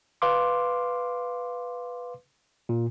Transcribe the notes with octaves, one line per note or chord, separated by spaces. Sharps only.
B4 F5 C6 D6
A#2